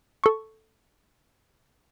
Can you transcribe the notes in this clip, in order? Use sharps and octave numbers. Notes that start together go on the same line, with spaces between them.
A4 C#6